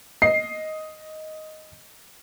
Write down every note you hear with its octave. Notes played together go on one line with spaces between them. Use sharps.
D#5 C7